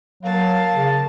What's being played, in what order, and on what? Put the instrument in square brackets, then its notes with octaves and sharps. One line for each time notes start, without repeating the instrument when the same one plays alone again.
[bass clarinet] F#3 [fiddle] A#3 A5 [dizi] F5
[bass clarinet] C#3